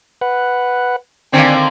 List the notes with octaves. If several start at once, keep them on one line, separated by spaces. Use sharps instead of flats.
B4 F#5
D3 D#3 A#3 C4 D5 G#5